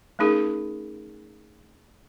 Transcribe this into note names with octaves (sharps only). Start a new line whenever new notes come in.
A3 C#4 D#4 G#4 A#4